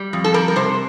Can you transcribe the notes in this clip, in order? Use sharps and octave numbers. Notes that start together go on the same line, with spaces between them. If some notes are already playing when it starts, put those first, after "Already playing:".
Already playing: G3
F2
A4
G3 A#4
A#4
C3 C5